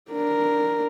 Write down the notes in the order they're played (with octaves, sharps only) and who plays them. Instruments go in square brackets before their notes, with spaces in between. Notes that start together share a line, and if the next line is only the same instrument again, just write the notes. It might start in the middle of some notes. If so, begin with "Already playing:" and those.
[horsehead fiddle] D4 A#4